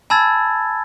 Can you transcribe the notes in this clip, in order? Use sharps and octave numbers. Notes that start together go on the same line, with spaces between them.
G#5 A5 B5 E6 G#6 A6